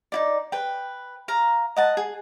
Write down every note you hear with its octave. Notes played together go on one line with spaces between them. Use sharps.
D#4 E4 D5
B4 G5
F5 A#5
D#5 F#5 A5
G#4